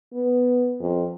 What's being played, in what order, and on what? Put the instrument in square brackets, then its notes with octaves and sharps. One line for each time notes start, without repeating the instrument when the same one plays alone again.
[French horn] B3
F2